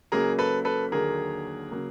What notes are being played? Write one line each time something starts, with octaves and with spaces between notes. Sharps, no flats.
C#2 C#3 F#3 A#3 G#4 A#4
A4 B4
A4 B4
D#2 D3 F#3 A#3 G#4 A#4
C#3 F#3 A#3